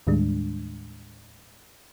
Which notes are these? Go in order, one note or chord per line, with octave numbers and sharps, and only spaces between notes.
D#2 A2 D#3 G3 G#3 D4